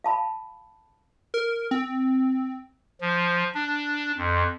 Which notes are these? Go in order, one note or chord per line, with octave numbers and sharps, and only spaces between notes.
F5 A5 B5
A#4
C4
F3
D4
F2